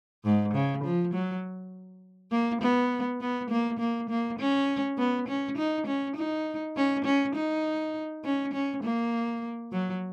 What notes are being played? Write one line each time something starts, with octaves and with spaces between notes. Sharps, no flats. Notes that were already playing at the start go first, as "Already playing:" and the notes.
G#2
C#3
F3
F#3
A#3
B3
B3
A#3
A#3
A#3
C#4
B3
C#4
D#4
C#4
D#4
C#4
C#4
D#4
C#4
C#4
A#3
F#3